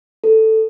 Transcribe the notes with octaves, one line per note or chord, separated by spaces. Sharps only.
A4